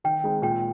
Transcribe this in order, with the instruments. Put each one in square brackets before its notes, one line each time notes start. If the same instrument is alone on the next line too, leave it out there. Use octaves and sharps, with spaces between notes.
[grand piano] D#3 [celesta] G5
[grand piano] G#3 C4 D#4
[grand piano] A#2 [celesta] G5